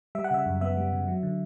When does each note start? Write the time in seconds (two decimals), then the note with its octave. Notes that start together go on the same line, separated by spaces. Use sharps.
0.15 G3 E5
0.24 F#5
0.31 C#3 E5
0.46 F#2
0.61 B3 E5
0.77 G3
0.92 C#3
1.08 F#3
1.23 D3